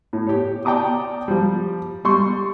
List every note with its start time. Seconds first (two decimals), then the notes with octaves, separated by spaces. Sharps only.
0.13 A2
0.27 G4 C#5
0.65 D5 G5 A5 A#5 D6 D#6
1.28 F3 G3
2.05 G3 C6 C#6